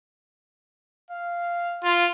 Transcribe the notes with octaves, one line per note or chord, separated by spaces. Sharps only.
F5
F4